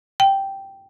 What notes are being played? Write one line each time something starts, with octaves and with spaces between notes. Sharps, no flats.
G5